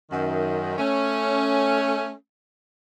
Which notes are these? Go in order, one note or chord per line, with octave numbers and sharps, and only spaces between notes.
F#2 D#3
A3 C#4